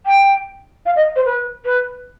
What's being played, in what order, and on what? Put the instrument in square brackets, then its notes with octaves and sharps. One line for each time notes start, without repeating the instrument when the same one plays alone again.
[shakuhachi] G5
F5
D#5
C5
B4
B4